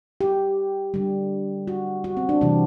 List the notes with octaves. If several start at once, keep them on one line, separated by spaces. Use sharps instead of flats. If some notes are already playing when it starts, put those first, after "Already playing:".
G4
D3 G3
F#4
F#4
C4
D4
C3 E3 G3 C4